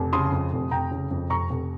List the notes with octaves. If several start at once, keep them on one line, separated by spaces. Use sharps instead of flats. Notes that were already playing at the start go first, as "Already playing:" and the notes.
Already playing: F1
C#3 C6 D#6
F2
F1
F1 G5 A#5
C#3
F2
F1 A#5 C#6
F1